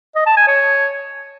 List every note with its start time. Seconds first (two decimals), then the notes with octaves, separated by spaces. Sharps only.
0.15 D#5
0.26 A5
0.37 G#5
0.47 C#5